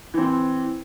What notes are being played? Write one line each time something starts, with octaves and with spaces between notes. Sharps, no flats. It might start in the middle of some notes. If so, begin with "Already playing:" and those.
E3 C4